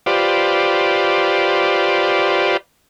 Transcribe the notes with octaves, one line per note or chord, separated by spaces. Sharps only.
F4 G4 B4 C5 D5